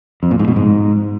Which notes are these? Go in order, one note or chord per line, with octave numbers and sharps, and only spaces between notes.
F2
A#2
G#2
B2
G#2